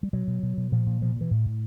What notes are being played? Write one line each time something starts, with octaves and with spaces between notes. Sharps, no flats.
G3
B2 F#3
B2
B2
B2
A#2 F3
A#2
B2 F3
B2 E3
A2
A2